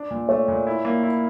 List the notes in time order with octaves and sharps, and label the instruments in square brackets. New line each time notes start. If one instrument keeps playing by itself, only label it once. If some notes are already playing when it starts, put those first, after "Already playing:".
Already playing: [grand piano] D4
A#2
[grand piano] A3 [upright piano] C#5
[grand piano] A#2
E4
A#3
E4